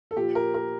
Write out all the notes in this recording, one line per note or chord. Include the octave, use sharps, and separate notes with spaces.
A4
A#2 F3 G4
A#4
A#4